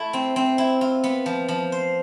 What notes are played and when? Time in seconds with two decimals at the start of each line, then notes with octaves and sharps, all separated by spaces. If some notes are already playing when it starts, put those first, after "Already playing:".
Already playing: A3 E4
0.13 C4
0.36 C4
0.58 E4
0.81 F4
1.04 B3
1.26 F3
1.48 F3
1.72 C5